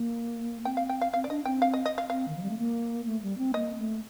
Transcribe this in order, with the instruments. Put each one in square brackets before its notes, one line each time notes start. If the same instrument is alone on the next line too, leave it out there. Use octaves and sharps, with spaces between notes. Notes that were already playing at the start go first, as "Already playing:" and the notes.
Already playing: [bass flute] A#3
[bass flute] C4 [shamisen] G5
[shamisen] F5
G5
F5
[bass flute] C4 [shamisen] F5
[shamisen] D5
[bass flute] D4 [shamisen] D#5
[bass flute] C4 [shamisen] G5
[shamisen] F5
D#5
D#5
F5
[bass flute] C4 [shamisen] F5
[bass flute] D#3
F3
G3
A3
A#3
A3
G3
C4
[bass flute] A#3 [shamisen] D#5
[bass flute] A3